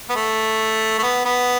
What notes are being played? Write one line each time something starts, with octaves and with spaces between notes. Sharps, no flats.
B3
A3
A3
B3
B3